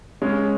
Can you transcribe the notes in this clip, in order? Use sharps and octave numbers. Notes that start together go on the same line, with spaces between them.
C#3 G#3 C#4